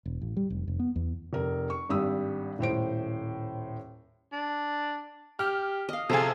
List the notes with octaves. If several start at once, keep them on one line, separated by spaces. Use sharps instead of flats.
E1
A1
G3
F1
F1
B3
E2
F1 A#4
C#6
G#1 G2 G3 D#6 E6
D#1 A2 C5 D7
D4
G4 F6
D#5 F5
C3 F3 G#4 A4 F5